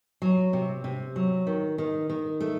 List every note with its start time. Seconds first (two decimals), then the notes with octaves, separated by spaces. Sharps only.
0.22 F#3
0.53 C3
0.84 C3
1.16 F#3
1.47 D#3
1.78 D#3
2.10 D#3
2.40 A3